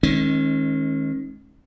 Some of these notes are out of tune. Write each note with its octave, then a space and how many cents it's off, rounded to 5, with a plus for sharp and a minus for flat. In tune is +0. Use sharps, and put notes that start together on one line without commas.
D#3 +10 G#3 +25 C#4 -35